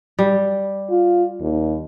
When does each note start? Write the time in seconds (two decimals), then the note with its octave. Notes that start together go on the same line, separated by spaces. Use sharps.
0.19 G3
0.90 F4
1.40 D#2